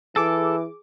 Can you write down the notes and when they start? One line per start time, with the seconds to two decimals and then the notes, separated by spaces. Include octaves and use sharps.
0.16 E3 G#4 A4 D6